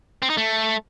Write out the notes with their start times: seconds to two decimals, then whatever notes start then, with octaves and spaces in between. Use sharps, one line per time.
0.22 C4
0.30 D#4
0.37 A3